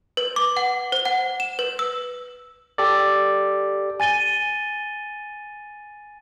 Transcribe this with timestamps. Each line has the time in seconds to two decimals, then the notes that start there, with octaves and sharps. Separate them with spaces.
0.17 B4
0.36 D6
0.57 F#5
0.92 C5
1.05 F#5
1.40 E7
1.59 B4
1.79 E6
2.78 G4 A4 D5
4.00 G#5 A6 D#7 G7